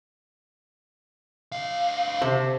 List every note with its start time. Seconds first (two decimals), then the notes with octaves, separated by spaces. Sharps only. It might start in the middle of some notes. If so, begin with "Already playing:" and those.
1.52 D2 F5
2.22 C3 C5